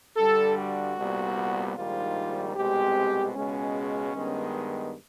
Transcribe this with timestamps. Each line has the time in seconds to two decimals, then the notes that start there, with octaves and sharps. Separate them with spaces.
0.17 G2 D3 G3 A4
0.57 F#4
0.97 C2 A#2 G3 B3
1.76 A#1 G#2 D#3 G3 F4
2.55 C2 B2 G#3 C4 G4
3.35 C#2 B2 G#3 C#4
4.15 G2 D#3 G#3 B3